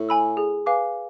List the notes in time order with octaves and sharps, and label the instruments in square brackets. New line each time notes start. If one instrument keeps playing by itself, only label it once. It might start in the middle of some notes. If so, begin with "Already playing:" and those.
Already playing: [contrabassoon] A2
[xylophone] G#5 B5 E6
G#4
B4 F5 G#5 D6